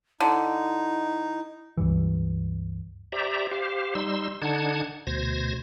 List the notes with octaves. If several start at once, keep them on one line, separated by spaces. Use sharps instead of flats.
D3 D#4 E4
C#2 G2 E3
G4 C5 D5 E5 A#5
G4 C5 F5
G3 D#4 C6 E6
D3 D4 D#4 F#5 A5 G#6
D2 B2 C5 G#6 A#6